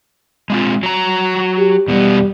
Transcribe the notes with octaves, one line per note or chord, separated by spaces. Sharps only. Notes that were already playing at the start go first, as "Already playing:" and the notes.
G#3 C4 F4
F#3 A#5
G4
E2 B2 G3 B3